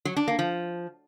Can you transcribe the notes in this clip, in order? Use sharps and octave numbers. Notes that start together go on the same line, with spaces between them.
F#3
D4
A#3
F3